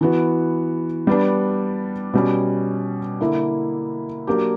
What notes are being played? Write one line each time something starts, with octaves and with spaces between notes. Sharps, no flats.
E3 B3 F#4
G3 B3 D4
B2 G3 C#4
D3 A#3 E4
F#3 A#3 D4 G4